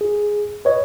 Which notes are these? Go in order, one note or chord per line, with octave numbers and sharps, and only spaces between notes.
G#4
B4 C#5 D#5